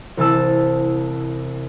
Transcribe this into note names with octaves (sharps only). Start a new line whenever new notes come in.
C2 E3 A5 E6